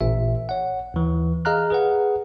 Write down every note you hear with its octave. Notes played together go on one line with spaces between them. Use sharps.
A1 A#2 E5
C#5 F#5
D#2 E3
G#4 D#5 F5 A#5 F6 F#6
G#4 B4 F#5